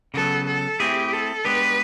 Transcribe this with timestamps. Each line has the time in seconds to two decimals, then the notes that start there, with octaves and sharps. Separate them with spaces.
0.14 C#3 F#3 B3 A4
0.47 A4
0.79 A3 C4 E4 G4 G#4
1.13 A4
1.45 G#3 B3 D4 G4 B4